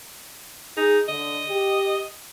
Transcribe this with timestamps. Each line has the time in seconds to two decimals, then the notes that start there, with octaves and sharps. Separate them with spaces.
0.77 D#4 G#4
1.08 D3 D#5
1.49 G4